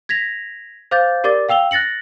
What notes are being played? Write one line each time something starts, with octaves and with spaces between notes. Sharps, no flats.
G#6 A#6 B6 F7
C5 F5 D6 G6 A6
G4 A#4 D5 D6 A6
F5 G5 E6 F7 G7
F#6 A6 A#6 C#7 F#7